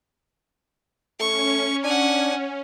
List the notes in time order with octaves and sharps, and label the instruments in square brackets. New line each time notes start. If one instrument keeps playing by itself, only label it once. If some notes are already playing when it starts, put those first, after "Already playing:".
[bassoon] A3 [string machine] C#4 [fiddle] C#6
[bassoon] D4 [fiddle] F#5 G#5